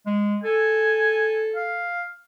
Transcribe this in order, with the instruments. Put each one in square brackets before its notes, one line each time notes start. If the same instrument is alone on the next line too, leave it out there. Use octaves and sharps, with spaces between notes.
[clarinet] G#3
[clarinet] A4 [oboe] G#5
[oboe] F5